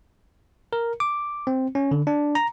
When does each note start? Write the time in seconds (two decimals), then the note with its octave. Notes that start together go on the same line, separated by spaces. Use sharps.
0.73 A#4
1.00 D6
1.47 C4
1.75 C#4
1.91 D3
2.07 D4
2.35 A#5